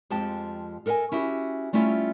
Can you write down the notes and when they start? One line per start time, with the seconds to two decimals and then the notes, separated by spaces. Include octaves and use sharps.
0.10 F2 F3 G#3 G4 A5
0.86 A4 A#4 D#5 F5 G#5
1.12 C#4 E4 F#4 G4
1.73 G3 A3 C#4 E4 F4